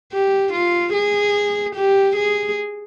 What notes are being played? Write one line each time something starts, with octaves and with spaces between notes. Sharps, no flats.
G4
F4
G#4
G4
G#4